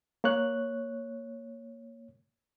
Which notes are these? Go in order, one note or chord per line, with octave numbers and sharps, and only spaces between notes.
A#3 C#5 F#6